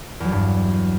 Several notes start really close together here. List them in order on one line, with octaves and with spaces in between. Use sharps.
E2 F#3 G3 G2